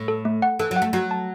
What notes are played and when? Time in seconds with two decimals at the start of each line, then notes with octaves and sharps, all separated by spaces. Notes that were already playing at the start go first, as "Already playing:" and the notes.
Already playing: A2
0.08 A4
0.25 A3
0.42 F#5
0.59 E3 A4
0.71 F#3
0.76 F#5
0.82 A3
0.93 F#3 F#4
1.11 A5